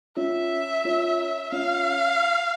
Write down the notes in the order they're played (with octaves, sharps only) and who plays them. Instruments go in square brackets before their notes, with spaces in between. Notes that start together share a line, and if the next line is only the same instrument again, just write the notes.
[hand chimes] C#4 F4 C#5 [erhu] E5
[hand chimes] C#4 F4 C#5
[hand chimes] C#4 F4 C#5 [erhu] F5